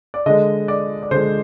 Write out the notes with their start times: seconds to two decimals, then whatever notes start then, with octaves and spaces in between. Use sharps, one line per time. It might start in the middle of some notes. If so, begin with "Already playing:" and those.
0.14 D5
0.26 D3 G#3 D#5
0.68 D5
1.03 D5
1.11 D3 G#3 C5